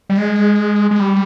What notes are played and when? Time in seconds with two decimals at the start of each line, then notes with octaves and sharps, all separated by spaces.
0.09 G3
0.17 G#3
0.91 G#3
1.00 G3